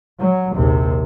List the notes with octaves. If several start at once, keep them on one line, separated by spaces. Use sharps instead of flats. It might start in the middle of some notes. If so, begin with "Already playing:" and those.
F#3
A#1 D#2 C3